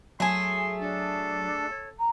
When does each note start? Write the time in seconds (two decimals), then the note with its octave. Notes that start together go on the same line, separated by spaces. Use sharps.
0.20 F#3 A3 G#4 G#5 C6
0.80 D4 A4
1.70 C#5
1.98 A#5